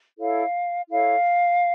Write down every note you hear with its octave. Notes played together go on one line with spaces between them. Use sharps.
E4 A4 C#5 F5
E4 A4 C#5 F5